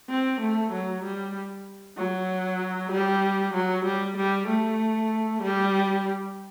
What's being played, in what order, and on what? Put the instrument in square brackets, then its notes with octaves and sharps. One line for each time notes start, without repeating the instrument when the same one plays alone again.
[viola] C4
A3
F#3
G3
F#3
G3
F#3
G3
G3
A3
G3